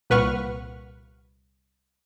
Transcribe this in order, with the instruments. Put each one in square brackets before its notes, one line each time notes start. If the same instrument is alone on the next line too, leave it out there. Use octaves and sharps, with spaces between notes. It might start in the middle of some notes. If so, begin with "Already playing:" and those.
[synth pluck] C2 A#2 B4 F#5 C#6 F6